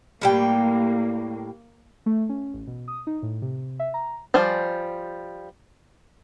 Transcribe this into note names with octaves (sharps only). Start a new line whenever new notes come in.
A2 G3 A#3 G5
A3
C#4
A1
B2
D#6
D#4
A2
C3
E5
A#5
F3 G3 C5 G#5